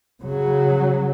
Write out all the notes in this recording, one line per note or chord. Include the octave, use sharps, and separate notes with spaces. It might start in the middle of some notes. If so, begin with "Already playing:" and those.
C#3 F#3